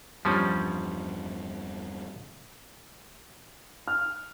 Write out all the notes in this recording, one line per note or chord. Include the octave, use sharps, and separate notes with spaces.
E2 G2 F3 G3 C#4
F6